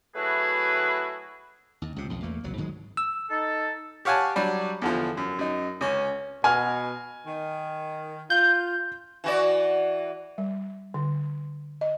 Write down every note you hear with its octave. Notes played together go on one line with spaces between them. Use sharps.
F#3 A3 E4 F#4 G#4 B4
D#2
C#2 C3
B1 F2
E2 A3 A#3
F#1 C2 F#3
G#2 D#3 F#3 G#3
E6
D#4 A4
G4 C#5 F5 F#5 G#5 A5
F#3 G3 D4
E2 D3 F3
F#2
F#2 D#4
C#2 C#4
B2 G#5 F6
D#3
F4 G6
E3 F#4 D5
G3
D3
D#5